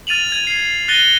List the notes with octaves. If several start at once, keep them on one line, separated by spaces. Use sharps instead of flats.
F6 A6 D#7 F7 F#7
G#6
G#6 C7
F#6 A6 A#6 C#7 D#7 G7